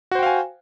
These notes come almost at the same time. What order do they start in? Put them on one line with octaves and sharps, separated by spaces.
F#4 C5 G5 F5 G#5